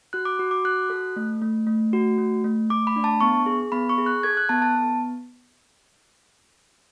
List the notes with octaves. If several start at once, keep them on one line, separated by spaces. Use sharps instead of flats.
F#4 F#6
D6
F#4
D6
F#4 F#6
A4
A3
A3
A3
F#4
A3
A3
A3 D6
B5
D4
A5
B3 C#6
G#4
B3 B5
C#6
G#4
F#6
A4 G#6
F#6
B3 A5
A5
B3